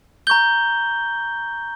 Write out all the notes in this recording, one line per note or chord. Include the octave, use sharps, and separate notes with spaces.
A#5 C#6 G6 G7